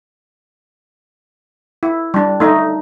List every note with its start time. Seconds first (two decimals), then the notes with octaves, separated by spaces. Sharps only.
1.83 E4
2.14 G3 D4
2.40 A3 D#4